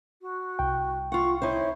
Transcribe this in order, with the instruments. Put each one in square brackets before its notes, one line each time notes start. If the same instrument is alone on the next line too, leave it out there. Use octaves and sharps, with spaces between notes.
[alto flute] F#4
[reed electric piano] C2 G5
[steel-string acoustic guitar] F4 F#5 [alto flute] C#6
[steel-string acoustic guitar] D#4 E4 C5 [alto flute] C#5